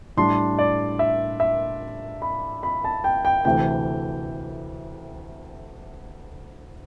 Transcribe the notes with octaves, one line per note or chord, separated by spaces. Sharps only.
A2 G3 D4 C6
D5
E5
E5
B5
B5
A5
G5
G5
D2 C3 E3 A3 G5